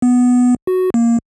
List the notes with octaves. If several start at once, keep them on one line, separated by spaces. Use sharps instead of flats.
B3
F#4
A#3